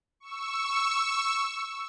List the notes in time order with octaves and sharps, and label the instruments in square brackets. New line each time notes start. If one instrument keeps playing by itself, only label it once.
[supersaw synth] C#6 E6